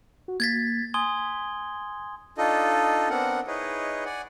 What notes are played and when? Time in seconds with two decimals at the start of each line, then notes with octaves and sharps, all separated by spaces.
0.28 F#4
0.40 A#3 G#6 A6 B6
0.94 G#5 C6 D#6 G#6 G7
2.38 D4 D#4 F4 A4 D#5
3.10 B3 C4 D4 A#4 F#5
3.47 D#4 E4 G#4 B4 C#5 D#5
4.05 D5 F#5 G#5